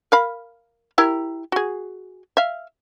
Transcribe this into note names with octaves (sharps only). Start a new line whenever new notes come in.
A#4 F5 B5
E4 G4 A#4
F#4 G#4
E5 F5